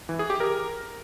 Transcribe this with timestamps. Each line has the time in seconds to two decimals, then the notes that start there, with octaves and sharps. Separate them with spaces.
0.09 E3
0.19 G#4
0.30 G4
0.40 A#4